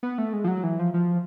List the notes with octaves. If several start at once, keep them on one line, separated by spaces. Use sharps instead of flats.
B3
A3
G#3
F3
F#3
E3
F3
F3